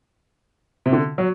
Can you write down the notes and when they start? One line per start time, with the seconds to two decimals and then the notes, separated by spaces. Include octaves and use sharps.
0.86 C3
0.93 D3
1.18 F#3